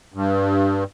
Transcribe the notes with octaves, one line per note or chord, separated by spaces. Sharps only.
G2